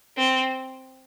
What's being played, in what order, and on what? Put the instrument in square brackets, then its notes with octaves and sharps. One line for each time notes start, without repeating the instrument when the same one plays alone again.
[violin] C4